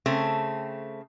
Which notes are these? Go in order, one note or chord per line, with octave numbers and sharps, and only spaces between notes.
C#3 A3 C4